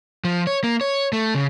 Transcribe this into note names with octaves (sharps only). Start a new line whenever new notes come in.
F3
C#5
A#3
C#5
A3
C#3